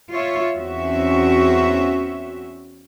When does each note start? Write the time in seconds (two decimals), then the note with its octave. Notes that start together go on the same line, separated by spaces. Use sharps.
0.11 F4 C#5 E5
0.57 E2 C4 C#4 F#4 E5